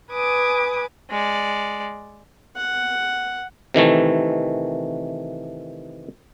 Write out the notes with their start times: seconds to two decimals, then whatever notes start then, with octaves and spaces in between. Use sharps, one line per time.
0.12 B4 G#5 D6 D#6
1.10 G#3 D5
2.57 F#5
3.74 C3 D#3 E3 A3